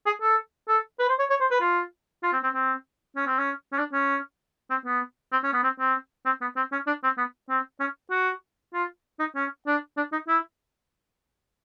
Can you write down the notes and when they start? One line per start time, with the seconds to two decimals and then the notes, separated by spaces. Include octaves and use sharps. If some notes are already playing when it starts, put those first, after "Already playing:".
0.06 G#4
0.21 A4
0.68 A4
0.99 B4
1.09 C5
1.19 C#5
1.30 C#5
1.41 C5
1.51 B4
1.61 F4
2.23 F4
2.33 C4
2.43 C4
2.54 C4
3.16 C#4
3.27 C4
3.39 C#4
3.72 C#4
3.78 D4
3.93 C#4
4.70 C4
4.85 B3
5.32 C4
5.43 C#4
5.53 B3
5.63 C4
5.80 C4
6.26 C4
6.41 B3
6.56 C4
6.72 C#4
6.87 D4
7.03 C4
7.18 B3
7.49 C4
7.80 C#4
8.11 F#4
8.74 F4
9.19 D#4
9.36 C#4
9.67 D4
9.97 D4
10.12 D#4
10.28 E4